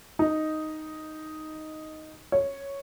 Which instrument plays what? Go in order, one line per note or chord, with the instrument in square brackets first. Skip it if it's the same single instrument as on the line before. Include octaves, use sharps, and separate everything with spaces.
[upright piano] D#4
C#5